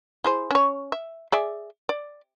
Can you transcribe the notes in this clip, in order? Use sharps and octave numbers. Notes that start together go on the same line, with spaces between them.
E4 G#4 C5
C#4 C#5
E5
G#4 D5 E5
D5